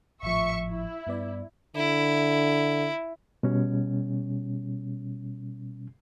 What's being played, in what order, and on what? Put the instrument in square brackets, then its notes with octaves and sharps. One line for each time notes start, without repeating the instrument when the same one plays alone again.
[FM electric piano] G#1 A2 F3 [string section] E5 C#6
[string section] E4
[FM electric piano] G2 B3 D5
[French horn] D3 [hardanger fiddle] E4
[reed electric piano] B2 G3 C#4